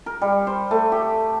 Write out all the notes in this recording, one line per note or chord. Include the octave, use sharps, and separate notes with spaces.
A#4
G3
C5
A3
G4